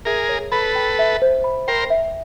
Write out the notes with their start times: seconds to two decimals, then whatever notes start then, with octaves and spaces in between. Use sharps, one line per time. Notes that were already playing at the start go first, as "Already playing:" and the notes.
0.05 G#4 A#4 E5
0.29 C#5
0.52 A4 B4 B5
0.75 G5
0.99 E5
1.22 C5
1.44 B5
1.68 A#4 C5 G5
1.90 E5